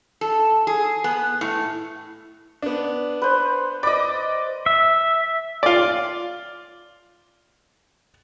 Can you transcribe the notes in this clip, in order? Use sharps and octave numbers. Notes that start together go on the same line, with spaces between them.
A4
G#4
B3
A2
B3 D4
B4 C5
D5 D#5 B5 D6
E5
F4 D5